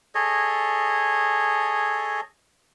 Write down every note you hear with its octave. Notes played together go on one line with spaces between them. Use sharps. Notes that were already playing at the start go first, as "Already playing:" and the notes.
G#4 A4 C#5 D#5